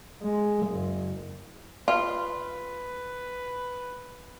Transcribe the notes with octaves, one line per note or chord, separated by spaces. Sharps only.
G#3
F#1
F4 B4